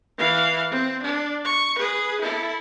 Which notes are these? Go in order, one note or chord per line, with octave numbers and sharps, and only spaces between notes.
E3 F5
C4
D4
C#6
G#4 B4
E4 A4